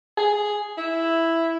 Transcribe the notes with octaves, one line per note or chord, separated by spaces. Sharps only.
G#4
E4